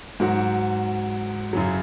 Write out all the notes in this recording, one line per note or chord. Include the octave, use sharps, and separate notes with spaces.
G#2 F#3 F#4
F#2 C#3 F#3